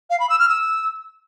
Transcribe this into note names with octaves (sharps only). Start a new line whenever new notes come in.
F5
B5
E6
F6
E6